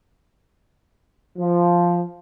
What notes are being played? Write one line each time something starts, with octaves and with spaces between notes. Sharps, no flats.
F3